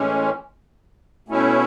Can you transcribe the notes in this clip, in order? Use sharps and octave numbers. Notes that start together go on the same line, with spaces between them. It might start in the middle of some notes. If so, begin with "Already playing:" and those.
Already playing: A2 E3 G#3 C#4
B2 A3 C#4 E4